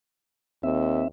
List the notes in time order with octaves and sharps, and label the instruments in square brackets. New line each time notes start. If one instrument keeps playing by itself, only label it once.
[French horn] D#2 [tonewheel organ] C4 E5